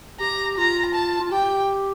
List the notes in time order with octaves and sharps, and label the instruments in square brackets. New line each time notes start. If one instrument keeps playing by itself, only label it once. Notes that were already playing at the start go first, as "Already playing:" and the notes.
[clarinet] G4 [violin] A#5
[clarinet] F4 [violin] A#5
[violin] A5
[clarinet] F4
[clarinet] G4 [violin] G5